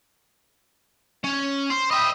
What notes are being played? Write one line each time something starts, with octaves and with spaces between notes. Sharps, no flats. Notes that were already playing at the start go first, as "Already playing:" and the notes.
C#4
C5
D#5 E5 G5 B5 D#6